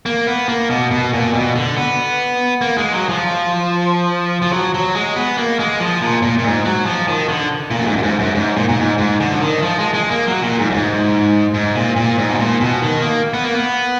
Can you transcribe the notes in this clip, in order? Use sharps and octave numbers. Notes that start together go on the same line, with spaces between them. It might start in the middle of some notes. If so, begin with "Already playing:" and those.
A#3
B3
A#3
B2
B2
A#2
B2
D3
B3
A#3
G#3
F#3
F3
F3
F#3
F#3
G#3
B3
A#3
G#3
F3
A#2
A#2
A#2
G#2
F#3
F3
D#3
D3
A#2
F#2
G#2
F#2
G#2
F#2
G#2
A#2
A#2
G#2
G#2
D3
F3
D#3
F3
G#3
G#3
A#3
F#3
A#2
G#2
F#2
G#2
G#2
A#2
A#2
G#2
B2
A#2
B2
D#3
A#3
B3
A#3
B3